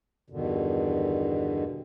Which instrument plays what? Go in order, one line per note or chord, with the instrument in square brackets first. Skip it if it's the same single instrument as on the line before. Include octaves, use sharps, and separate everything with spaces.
[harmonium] E2 G2 B2 D3 D#3